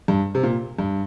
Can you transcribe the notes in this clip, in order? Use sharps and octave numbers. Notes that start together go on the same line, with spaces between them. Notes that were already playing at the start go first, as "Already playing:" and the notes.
G2
C3
A#2
G2